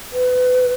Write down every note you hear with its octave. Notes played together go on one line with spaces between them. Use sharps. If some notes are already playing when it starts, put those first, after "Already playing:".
B4